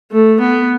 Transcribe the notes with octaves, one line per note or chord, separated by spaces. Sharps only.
A3
B3